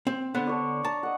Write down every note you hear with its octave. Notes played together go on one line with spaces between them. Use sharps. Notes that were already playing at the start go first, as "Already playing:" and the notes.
C4
D3 B3 C5
D4 C#5 D5
A5 A#5
D#5 F#5